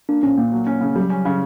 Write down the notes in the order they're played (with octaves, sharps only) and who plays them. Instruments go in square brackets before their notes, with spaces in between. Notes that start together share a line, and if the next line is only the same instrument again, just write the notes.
[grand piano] A#3 [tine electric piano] D4
[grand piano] A#1 [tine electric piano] C#4
[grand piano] A#2 [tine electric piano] A#3
[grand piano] F#3
C#4
C#3
[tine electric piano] F#3 [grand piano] G3
[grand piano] C#4
C#3